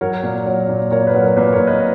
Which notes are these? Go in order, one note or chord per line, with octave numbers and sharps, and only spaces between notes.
F#3 A#4 C#5
A#2
F#3
A#2
A#2 A#4 C#5
B4
F#3
A#4
A#2 B4
A#4 C#5
A#2
B4 D#5